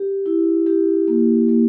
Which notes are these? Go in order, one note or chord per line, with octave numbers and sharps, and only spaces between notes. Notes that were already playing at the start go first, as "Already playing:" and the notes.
Already playing: G4
E4
G4
A#3
A#3